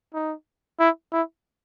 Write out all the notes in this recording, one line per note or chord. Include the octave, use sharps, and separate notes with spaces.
D#4
E4
E4